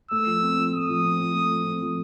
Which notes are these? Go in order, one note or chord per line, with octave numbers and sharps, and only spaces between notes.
A3 E6
F3
C4
F3
A3 D#6
F3
C4
F3
A3
F3
C4
F3